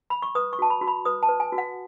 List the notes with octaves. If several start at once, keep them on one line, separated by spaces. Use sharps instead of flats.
B5
C#6
B4 D#6
C#6
F#4 A5
B5
F#4
B5
B4 D#6
A5
B4
G#5
F#4
F#5